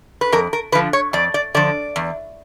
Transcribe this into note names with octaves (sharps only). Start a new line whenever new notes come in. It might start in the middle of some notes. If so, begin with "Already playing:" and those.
B4
F2 A#4
A#4
D3 F3 B4
C#5
F2 D5
D5
D3 F3 D5
E2